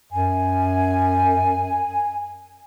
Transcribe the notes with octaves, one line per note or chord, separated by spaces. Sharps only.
F#2 G#5